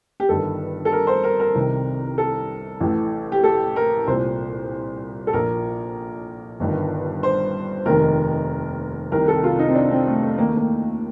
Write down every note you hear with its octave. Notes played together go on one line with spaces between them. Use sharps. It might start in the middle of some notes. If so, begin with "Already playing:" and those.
G4
G1 G2 D#3 A4
A4
A#4
C5
A#4
A#4
C2 C3 D#3
A4
A1 A2
G4
A4
A#4
C2 A#2 C5
A4
A#1 A#2 A#4
G1 G2 D#3
C5
F1 D#2 D#3 A#4
C2 C3 D#3 A#4
A4
F4
D#4
C4
D4
C4
A3
A3
D#2 D#3 A#3
A3
A#3